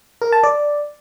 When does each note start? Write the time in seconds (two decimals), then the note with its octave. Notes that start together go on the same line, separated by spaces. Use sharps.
0.22 A#4
0.33 A5
0.43 D5